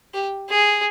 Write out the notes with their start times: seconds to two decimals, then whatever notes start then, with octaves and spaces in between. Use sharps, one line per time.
0.14 G4
0.50 G#4